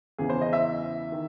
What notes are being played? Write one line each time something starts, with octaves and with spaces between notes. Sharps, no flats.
E2 C#3 E3 G#4
C5
D#5
E5
D#3